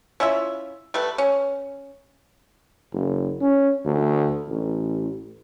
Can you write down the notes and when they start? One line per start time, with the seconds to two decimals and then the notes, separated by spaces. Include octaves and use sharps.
0.20 C#4 E4 F4 E5
0.94 G3 A3 B4
1.18 C#4
2.93 F#1
3.41 C#4
3.85 D2
4.48 A1